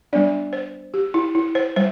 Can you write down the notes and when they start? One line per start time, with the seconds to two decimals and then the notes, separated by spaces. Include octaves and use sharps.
0.13 G3 B3 D4 D5
0.53 C5
0.94 G4
1.14 E4
1.35 E4
1.55 C5
1.76 G3 C5